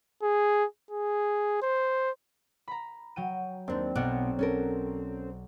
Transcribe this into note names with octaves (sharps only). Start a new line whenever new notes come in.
G#4
G#4
C5
A#5 B5
F#3 G5 D#7
D#2 C4 D4
B1 B2 D5 F#5 F#6
C#4 A4 A#4